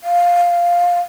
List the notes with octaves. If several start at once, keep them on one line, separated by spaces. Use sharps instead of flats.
F5